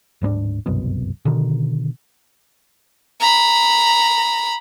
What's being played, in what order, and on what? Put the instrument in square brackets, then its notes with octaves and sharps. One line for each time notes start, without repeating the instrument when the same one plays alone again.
[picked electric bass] D1 G#2 B3 D4
G1 C2 F#2 B2
B2 D3 D#3
[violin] A#5 B5